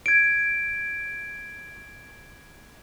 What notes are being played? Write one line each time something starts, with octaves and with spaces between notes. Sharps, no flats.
G#6 D7